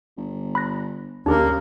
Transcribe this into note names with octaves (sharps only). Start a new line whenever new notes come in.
G1
B5 F#6 A#6
D#2 C#3 A#3 D4 G4